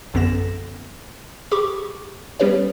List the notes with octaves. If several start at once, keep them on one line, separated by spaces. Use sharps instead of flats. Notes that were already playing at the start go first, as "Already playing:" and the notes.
A#1 F#2 D3 B3 A#6 E7
G4 G#4 B5 C#6 D6
G3 B3 C#4 G4 B4 C#5